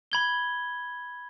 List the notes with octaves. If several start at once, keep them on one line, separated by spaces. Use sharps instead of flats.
B5 G#6 G7